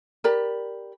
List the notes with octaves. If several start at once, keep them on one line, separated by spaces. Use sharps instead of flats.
G4 A#4 D5 B5